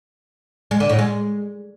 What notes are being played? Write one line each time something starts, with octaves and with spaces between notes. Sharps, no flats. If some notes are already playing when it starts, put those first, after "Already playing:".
G#3
D3
A2
G#3